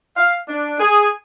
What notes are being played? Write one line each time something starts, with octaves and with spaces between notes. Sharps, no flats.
F5
D4
G#4